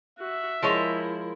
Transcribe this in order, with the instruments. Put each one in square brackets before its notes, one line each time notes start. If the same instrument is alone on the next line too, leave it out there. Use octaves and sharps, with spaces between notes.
[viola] F#4 [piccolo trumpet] E5
[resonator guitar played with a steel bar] F3 G#3 C#5 [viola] E4 A#4